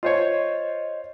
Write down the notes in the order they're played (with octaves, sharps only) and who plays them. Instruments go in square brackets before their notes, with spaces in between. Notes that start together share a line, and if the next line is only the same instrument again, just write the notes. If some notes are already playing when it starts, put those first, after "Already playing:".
[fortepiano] F4 C5 C#5 [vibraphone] D#5